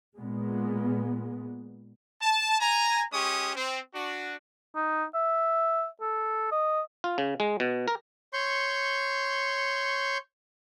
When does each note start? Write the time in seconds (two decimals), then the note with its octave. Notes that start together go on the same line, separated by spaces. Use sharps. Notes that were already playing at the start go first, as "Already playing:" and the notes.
0.17 A#2 G#3 B3
2.22 A5
2.60 G#5 A#5
3.12 G#3 C#4 G4 C#6 D#6
3.56 C4
3.94 D4 F#4
4.75 D#4
5.14 E5
6.01 A4
6.51 D#5
7.04 F4
7.18 C#3
7.40 G#3
7.60 B2
7.88 A#4
8.33 C#5 C6 C#6 G6